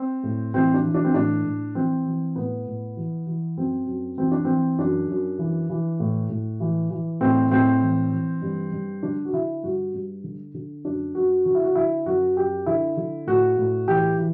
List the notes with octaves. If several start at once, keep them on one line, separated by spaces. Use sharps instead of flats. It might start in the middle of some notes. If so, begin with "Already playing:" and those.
Already playing: C4
A2
E3 C4
D4
E3
D4
C4
A2 D4
A2
E3 C4
E3
A2 B3
A2
E3
E3
F#2 C4
F#2
E3 C4
D4
E3 C4
F#2 D4
F#2
E3
E3
A2
A2
E3
E3
A2 C4
A2 C4
E3
E3
G2
G2
D3 D4
F#4
D3 E4
G2 F#4
G2
D3
D3
F#2 D4
F#2 F#4
D3 F#4
E4
F#4
D3 E4
F#2 F#4
F#2 G4
D3 E4
D3
A2 F#4
A2
E3 G4
E3